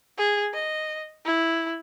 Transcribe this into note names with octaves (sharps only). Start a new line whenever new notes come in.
G#4
D#5
E4